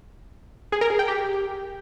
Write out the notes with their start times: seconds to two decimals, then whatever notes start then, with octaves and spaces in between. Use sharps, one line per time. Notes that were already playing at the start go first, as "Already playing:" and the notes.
0.72 G#4
0.81 A#4
0.90 G#4
0.99 G5
1.08 G4